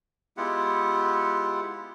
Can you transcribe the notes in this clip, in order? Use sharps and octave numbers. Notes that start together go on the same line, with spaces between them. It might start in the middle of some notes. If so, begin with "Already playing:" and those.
G#3 B3 E4 F4 G4 F#5